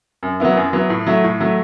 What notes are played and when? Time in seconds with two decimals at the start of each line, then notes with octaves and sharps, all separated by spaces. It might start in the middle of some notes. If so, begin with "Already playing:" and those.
0.23 F#2
0.40 F#3 B3 E4
0.56 F#2
0.73 F#3 B3 E4
0.90 A2
1.07 F#3 A3 E4
1.24 A2
1.40 F#3 A3 E4